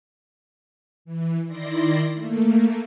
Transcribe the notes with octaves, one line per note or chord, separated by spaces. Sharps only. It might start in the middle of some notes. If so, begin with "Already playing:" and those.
E3
D#3 E4 D5 C6 A#6
A3 A#3